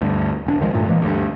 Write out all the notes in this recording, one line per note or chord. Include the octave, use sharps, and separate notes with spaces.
D2 G2
E1 C#4 D4
C#2 D#3 F3 G#3
G2 A#2 A3
E3 G#3 A#3
D2 G2